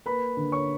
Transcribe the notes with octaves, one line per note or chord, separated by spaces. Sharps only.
A#3 B4 B5
D3
C#5 C#6